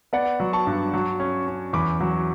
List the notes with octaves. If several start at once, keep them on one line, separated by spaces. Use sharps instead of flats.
B3 D5 F#5
F#3
A5 C#6
G2
F#3
C#4
C#4
E2 B5 D6
F#3